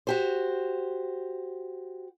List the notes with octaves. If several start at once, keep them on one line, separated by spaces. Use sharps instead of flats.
F#4 G4 C5